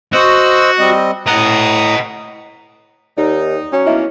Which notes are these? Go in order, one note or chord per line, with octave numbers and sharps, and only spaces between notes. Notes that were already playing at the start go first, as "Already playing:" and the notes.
F#4 C5 D#5 E6
G3 C4 D#5
A2 D#5 F#5 A#5 D#6
D#2 D#4 D5
F#3 C#4
F3 A#3 B3 E4 D#5 E5